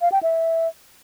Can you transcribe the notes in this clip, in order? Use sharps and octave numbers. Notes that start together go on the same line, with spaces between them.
F5
G5
E5